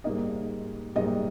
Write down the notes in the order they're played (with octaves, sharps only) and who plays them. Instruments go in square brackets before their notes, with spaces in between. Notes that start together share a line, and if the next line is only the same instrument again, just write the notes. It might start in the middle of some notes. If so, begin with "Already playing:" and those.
[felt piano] G#2 G3 A#3 D#4 D#5
G#2 G3 A#3 D#4 D#5